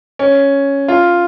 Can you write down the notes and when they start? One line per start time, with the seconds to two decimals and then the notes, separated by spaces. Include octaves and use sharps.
0.19 C#4
0.88 F4